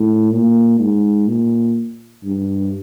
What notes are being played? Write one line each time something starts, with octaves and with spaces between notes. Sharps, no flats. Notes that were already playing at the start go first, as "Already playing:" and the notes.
Already playing: A2
A#2
G#2
A#2
G2